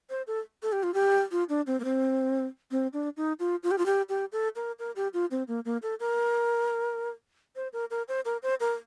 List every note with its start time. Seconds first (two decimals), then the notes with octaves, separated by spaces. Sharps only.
0.10 C5
0.27 A4
0.63 A4
0.72 G4
0.83 F4
0.94 G4
1.31 F4
1.49 D4
1.67 C4
1.80 A#3
1.85 C4
2.71 C4
2.93 D4
3.17 D#4
3.40 F4
3.63 F4
3.71 G4
3.78 F4
3.86 G4
4.09 G4
4.32 A4
4.56 A#4
4.79 A#4
4.96 G4
5.14 F4
5.31 C4
5.48 A#3
5.65 A#3
5.83 A4
6.00 A#4
7.56 C5
7.73 A#4
7.91 A#4
8.08 C5
8.25 A#4
8.43 C5
8.60 A#4